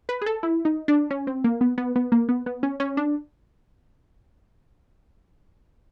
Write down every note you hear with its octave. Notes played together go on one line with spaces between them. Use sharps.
B4
G#4
A4
E4
D#4
D4
C#4
C4
A#3
B3
B3
B3
A#3
B3
B3
C#4
C#4
D4